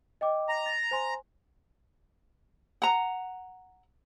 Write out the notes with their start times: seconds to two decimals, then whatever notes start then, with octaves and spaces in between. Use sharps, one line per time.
0.21 D#5 G5 D6
0.49 A#5
0.66 A6
0.91 C5 G#5 C6
2.82 F#5 A#5